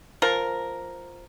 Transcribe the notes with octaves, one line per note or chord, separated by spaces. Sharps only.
F3 A#4